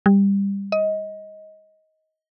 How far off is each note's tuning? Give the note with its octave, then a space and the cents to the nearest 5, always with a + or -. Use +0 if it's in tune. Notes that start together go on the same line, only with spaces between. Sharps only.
G3 +20
D#5 +20